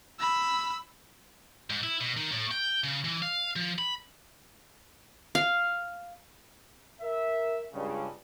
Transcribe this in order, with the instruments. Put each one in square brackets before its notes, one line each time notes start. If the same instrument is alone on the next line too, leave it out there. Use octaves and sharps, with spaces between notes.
[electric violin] B5 E6
[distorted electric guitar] G#2
E4
B2
D#3
A2
G5
C#3
E3
F5
F3
B5
[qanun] F5
[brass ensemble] A#4 E5
C#2 G2 C#3